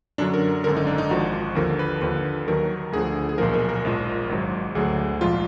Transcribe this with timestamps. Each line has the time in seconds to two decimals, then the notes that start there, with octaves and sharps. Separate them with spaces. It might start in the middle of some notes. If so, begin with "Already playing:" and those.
0.18 F#2 D3 F#3 D4
0.34 A#4
0.64 G#1 F#2 D3 A#4
0.77 D#4
0.87 D4
0.98 D#4
1.11 G#1 G#2 F3 F#4
1.55 D#2 D3 F3 A#4
1.79 B4
2.01 D#2 D3 F3 B4
2.47 D#2 D#3 F#3 A#4
2.92 D2 D3 F3 G#4
3.29 G#4
3.38 B1 A#2 F3 A#4
3.54 A#4
3.69 A#4
3.85 A#1 G#2 F3
4.29 G#1 G#2 F#3
4.75 D2 D3 F#3 G#4
5.21 A#1 G#2 F3 F4